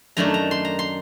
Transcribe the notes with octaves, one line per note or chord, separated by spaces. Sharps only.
F#2 D#3 A3 D4 A#5
A#5
C6
A#5
C6